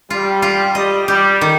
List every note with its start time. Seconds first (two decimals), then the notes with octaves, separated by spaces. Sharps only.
0.10 G3 F4
0.42 F4
0.75 G3 D#5
1.08 G3 G4
1.41 D#3